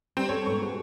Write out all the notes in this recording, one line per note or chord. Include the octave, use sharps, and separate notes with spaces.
G3 C4 D4
C#4 A4 C#5
G#2 B2 C#6
F#4 G#4 C5